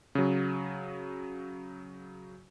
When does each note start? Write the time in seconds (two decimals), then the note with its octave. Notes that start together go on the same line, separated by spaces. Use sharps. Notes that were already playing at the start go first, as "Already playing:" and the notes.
0.15 C#3 F#3